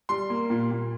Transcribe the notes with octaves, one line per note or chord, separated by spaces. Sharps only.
G3 C6
A#3
A#2
A#2